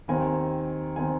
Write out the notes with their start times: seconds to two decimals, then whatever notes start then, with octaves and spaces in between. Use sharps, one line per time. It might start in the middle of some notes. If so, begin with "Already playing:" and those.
0.08 D#2 D#3 C4 G#5
0.96 D#3 C4 G#5